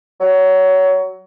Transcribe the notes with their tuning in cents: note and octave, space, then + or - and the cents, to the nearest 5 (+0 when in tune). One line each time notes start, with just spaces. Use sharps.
F#3 +20